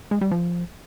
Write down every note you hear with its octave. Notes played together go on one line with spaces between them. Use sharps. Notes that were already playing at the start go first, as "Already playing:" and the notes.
G#3
G3
F3